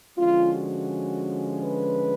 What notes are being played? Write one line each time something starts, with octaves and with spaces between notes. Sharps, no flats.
D3 F3 G#3 C#4 F4
F#4
B4